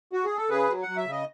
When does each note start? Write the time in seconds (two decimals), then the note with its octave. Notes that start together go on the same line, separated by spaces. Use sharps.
0.13 F#4
0.25 G#4
0.37 A4
0.50 C#3 G#4 B4
0.69 F#3
0.83 F#3 F#5
0.97 E5
1.06 C#3 D#5